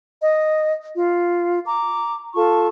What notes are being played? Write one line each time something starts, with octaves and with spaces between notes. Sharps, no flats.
D#5
F4
A#5 D6
F4 A4 A5 C#6